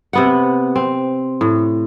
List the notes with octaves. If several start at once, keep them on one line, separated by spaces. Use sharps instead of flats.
C3 B3 F#5
C4
A2